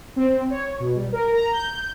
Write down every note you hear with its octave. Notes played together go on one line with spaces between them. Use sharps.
C4
C#5
B2
G3
A#4
A#5
G6